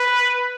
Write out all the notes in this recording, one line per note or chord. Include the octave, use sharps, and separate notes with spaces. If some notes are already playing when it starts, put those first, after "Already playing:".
Already playing: B4